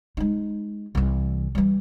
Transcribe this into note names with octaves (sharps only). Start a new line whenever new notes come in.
G#3 D#4
C2 E3
E3 G3